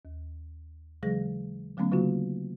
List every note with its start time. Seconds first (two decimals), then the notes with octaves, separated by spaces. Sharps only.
0.05 D#2
1.03 C#3 E3 F#3 G#3 G#4 A#6
1.77 D3 F#3 A3 B3 C#4
1.92 C#3 F#3 A#3 D#4 F4 F#4